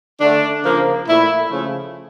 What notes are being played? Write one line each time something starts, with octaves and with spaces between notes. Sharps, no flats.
D3 A3 D4
C#3 F3 A#3
A#2 A3 E4
C#3 F3 A3